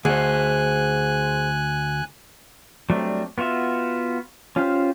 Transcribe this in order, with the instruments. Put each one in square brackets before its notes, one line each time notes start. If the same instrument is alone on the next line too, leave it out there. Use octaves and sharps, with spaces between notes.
[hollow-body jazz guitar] D2 [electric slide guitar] G#4 C5 [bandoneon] G#5 F#6
[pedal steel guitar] F#3 G3 A3 C4 D4
B3 F4 F#4 E5
C#4 F4 G4 C5